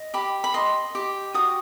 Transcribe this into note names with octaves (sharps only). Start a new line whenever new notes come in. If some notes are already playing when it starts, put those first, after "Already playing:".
Already playing: D#5
G4 B5
B5
D#5 C6
G4
F#4 D#6